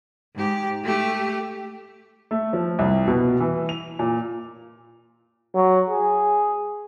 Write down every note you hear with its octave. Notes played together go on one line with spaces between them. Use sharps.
G#2 G4
A3 G4
A3
F3
C2
B2
E3
F7
A#2
F#3
G#4